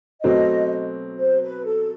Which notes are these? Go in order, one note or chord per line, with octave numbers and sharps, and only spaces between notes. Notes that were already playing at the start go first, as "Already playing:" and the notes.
B2 F#3 A3 C4 D#5
C5
B4
A4